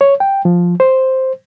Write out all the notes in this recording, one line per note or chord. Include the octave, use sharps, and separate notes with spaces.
C#5
G5
F3
C5